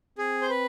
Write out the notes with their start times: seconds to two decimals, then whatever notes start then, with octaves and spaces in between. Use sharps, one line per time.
0.18 C4 G#4
0.42 C5
0.50 B4